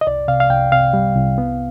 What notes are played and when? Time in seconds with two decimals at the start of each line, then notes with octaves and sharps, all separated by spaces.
0.01 D#5
0.07 C2 D5
0.28 C3 F5
0.40 F5
0.50 C2 G5
0.72 C3 F5
0.93 G3
1.16 C2
1.38 B3